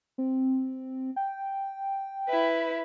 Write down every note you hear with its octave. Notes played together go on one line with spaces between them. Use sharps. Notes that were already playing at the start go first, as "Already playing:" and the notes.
C4
G5
E4 B4